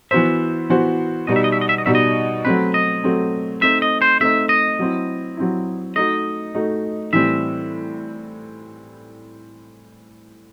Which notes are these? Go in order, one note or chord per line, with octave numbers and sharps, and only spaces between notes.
E3 B3 F#4 C5 E5
E3 B3 F#4 C5
B2 G3 D#4 D#5
E5
D#5
E5
D#5
E5
D#5
B2 G3 D#4 E5
D#5
F#3 A3 C4 B4
D#5
F#3 A3 C4
A3 C4 D#4 E5
D#5
C5
A3 C4 D#4 E5
D#5
F#3 C4 E4
F#3 C4 E4
A3 D#4 F#4 D#5
A3 D#4 F#4
A2 E3 G3 C4 E5